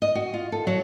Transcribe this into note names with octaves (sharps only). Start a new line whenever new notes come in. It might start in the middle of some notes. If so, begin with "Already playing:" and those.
D#5
F#4
F4
A4
F#3